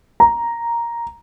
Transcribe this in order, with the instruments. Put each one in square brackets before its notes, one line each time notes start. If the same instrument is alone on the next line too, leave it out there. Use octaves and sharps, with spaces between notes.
[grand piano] A#5